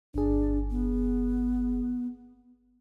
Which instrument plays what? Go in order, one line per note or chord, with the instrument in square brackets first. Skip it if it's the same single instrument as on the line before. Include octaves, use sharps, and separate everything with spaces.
[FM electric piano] G1 G#4 [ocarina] D4
[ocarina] B3